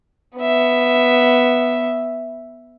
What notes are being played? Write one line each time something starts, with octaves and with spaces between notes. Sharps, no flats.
B3 E5